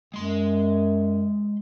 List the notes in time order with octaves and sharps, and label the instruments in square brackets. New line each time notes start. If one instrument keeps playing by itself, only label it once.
[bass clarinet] F#2 [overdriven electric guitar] G#3 C6